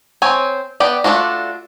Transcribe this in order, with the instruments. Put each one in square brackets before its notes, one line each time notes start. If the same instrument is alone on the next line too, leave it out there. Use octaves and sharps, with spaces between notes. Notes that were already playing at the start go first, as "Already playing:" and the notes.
[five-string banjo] C4 C#5 G#5
B3 D5 G5
A3 A#3 D4 F4 F#4